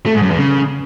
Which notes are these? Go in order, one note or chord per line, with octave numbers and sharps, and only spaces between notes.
A3
G#2
F#2
E2
C#3